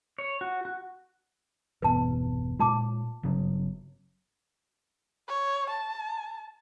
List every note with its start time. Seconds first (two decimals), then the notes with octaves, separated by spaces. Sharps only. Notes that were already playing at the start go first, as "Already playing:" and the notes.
0.18 C#5
0.41 F#4
0.65 F#4
1.82 G1 E2 B2 B4 A5
2.59 A#2 G#3 F4 A5 D6
3.23 G1 C#3 F#3
5.28 C#5
5.70 A5